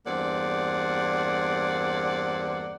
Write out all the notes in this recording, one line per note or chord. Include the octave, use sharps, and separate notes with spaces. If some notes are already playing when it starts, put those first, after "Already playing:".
E2 G2 A#3 C4 D5 F#5